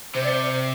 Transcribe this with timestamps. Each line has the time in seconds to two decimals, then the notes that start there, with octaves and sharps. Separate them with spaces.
0.15 C3 C5
0.24 D5
0.32 C5